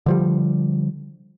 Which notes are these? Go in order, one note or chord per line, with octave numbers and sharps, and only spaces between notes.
D3 F3 G3